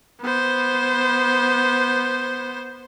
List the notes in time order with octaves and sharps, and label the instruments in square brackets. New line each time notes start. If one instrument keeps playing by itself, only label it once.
[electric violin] B3 C5